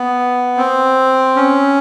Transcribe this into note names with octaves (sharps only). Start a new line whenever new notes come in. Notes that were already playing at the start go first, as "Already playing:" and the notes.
Already playing: B3
C4
C#4